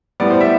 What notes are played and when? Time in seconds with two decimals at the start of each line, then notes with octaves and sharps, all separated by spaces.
0.20 A2 G3 B3 D5
0.30 C5
0.41 E5